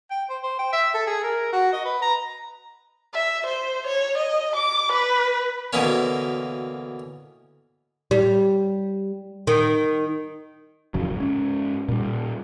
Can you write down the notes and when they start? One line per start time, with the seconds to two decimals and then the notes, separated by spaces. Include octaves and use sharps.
0.11 G5
0.30 C5
0.43 C5
0.59 G5
0.73 E5
0.94 A4
1.07 G#4
1.23 A#4
1.53 F#4
1.73 D#5
1.85 B4
2.02 A#5
3.14 E5
3.46 C5
3.86 C#5
4.18 D#5
4.56 D6
4.92 B4
5.73 D2 B2 E3 A#3 C#4
8.11 G3
9.47 D#3
10.94 G#1 F2 C#3 F#3
11.16 G#2 C#4
11.89 A#2 G3